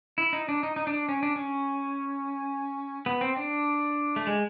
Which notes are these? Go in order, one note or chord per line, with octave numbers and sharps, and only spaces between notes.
E4
D#4
D4
D#4
D#4
D4
C#4
D4
C#4
B3
C4
D4
A3
G#3